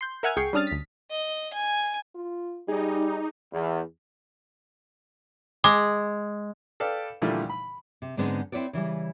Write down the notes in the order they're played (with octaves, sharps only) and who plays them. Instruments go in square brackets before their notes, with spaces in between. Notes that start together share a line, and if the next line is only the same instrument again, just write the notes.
[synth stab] C6 G6
A#4 E5 F#5 G#5 F6 G#6
C#2 G#4 G5 C#6 C7
G3 C#4 D4 D#6 F6 A6
D2 B6
[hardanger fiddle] D#5
G#5
[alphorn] F4
[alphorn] G3 [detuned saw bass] D#4 [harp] G#4 D5
[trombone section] E2
[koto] G#3 [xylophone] D6
[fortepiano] A4 B4 D5 F5 G5
A#2 D3 E3 F3 G3 A3
B5
[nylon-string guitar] C3
G#2 D3 G#3 B3 C4 D#4
C4 E4 B4 C#5 D5
C#3 E3 G3